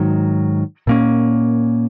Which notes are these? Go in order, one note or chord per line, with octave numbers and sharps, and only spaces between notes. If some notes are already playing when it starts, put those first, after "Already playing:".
Already playing: G#2 D#3 F#3
A#2 A#3 C#4